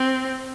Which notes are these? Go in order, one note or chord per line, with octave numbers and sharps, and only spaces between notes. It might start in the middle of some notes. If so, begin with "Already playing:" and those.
Already playing: C4